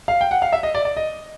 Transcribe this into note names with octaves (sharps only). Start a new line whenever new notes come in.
F5
G5
F#5
F5
E5
D#5
D5
D5
D#5